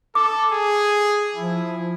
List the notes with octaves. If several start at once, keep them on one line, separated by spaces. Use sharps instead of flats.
A4 D6
G#4
F3 E4